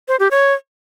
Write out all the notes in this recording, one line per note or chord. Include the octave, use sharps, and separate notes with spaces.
C5
G4
C#5